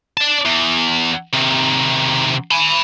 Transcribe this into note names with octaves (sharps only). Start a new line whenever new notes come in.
D5 A5
E2
C3 D#3
G#5 B5